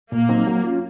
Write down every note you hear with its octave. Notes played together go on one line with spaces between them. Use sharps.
A#2 A#3
F#3 C4 D#4
F#3
C#4 F4